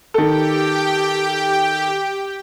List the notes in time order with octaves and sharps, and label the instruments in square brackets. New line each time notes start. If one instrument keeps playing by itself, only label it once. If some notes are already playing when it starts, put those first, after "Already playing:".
[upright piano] D#3 A4 [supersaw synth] G4 G5